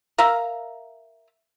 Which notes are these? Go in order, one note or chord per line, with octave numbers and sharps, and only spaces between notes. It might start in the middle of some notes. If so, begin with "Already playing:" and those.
A#4 E5 F5 A#5